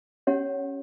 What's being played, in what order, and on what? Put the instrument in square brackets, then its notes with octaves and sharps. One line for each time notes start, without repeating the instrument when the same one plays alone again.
[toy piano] C#4 G4 C#5 F#5